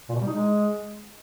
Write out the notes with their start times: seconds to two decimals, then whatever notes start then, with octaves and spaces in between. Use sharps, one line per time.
0.09 A#2
0.15 B2
0.21 G3
0.27 D#4
0.33 G#3